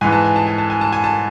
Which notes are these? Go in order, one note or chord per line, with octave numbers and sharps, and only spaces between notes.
G#2 E3 G#5
A5
G#5
A5
G#5
A5
G#5
A5
G#5
A5